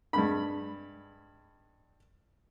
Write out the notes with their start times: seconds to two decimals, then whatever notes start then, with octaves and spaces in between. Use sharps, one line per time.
0.13 G2 G#3 B5